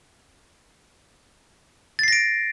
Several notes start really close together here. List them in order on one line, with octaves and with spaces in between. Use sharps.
A6 C7 A#6 D7